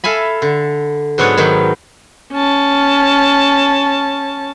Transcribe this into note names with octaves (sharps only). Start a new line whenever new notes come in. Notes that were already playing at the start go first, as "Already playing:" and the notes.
A4 E5 F5 G#5 B5
D3
G#2 F#3 B3 D4 C#5 G#5
G#2 D#3 F#3 B5
C#4 A5